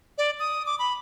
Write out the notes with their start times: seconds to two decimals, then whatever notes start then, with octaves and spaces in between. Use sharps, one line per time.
0.18 D5
0.39 D#6
0.66 D6
0.79 B5